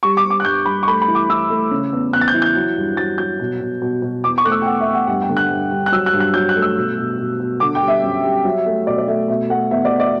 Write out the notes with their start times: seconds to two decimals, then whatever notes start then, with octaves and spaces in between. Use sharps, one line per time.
0.03 G3 C#6
0.17 D6
0.24 G3
0.30 D6
0.40 F#6
0.45 G2 G6
0.65 G3 B5
0.83 C#6
0.87 A3 B5
1.02 B5
1.08 E3
1.15 D6
1.29 E3 E6
1.50 A3
1.71 C#3
1.93 E2
2.13 E2 F#6
2.21 A6
2.28 G6
2.34 E3
2.42 G6
2.55 F#3
2.77 G2
2.97 F#3 A6
3.18 F#3 G6
3.40 B2
3.60 B2
3.82 B2
4.02 B2
4.24 E2 D6
4.38 C#6
4.44 A3 F#6
4.52 E6
4.62 G5
4.66 E2 F#5
4.80 E5
4.87 E2
4.94 F#5
5.07 G2 F#5
5.22 G5
5.29 D3
5.37 F#6
5.50 G2
5.71 G2
5.86 F#6
5.92 F#3 E6
6.06 F#6
6.13 G2
6.20 F#6
6.34 F#3 G6
6.49 F#6
6.56 A3
6.62 E6
6.77 B2
6.98 B2
7.18 B2
7.40 B2
7.60 D3 D6
7.75 G5
7.82 G3
7.88 E5
8.03 F#2
8.24 G3
8.45 F#3
8.66 A3
8.86 B2 D5
8.98 D5
9.08 A3 E5
9.28 B2 E5
9.50 A3 F#5
9.71 E2 E5
9.85 D5
9.92 E2
10.00 D5